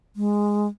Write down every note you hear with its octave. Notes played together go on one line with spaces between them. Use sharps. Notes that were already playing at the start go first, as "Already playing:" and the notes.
G#3